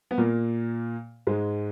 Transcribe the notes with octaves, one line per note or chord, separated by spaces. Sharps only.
B3
A#2 A#3
G#2 G#3